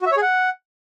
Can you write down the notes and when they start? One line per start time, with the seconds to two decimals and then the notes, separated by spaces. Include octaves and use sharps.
0.01 F#4
0.06 E5
0.12 C#5
0.17 G#4
0.22 F#5